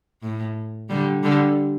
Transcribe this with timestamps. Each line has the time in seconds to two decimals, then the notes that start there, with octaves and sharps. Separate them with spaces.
0.22 A2
0.89 D3 G3
1.23 D3 G3